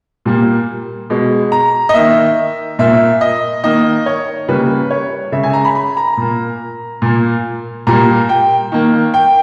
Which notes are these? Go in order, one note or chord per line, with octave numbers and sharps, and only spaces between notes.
A#2 G3 A#3
B2 G#3
A#5
D#5
D#3 A#3 E5
A#2 A#3 E5
D#5
D#3 A#3 D#5
C#5
C#3 G3 A#3 B4
C#5
C#3 G#3 E5
G#5
A#5
B5
B5
A#5
A#2 A#3
A#2 A#3
A#2 G3 A#3 A#5
G5
D#3 A#3
G5